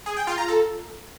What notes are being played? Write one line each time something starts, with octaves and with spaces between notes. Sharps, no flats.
G#4
G5
F4
A#5
A4